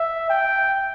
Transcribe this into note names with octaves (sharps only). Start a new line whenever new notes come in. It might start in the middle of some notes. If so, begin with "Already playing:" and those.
Already playing: E5
G5